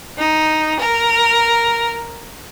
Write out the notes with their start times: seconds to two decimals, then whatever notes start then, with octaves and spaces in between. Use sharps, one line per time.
0.20 D#4
0.80 A#4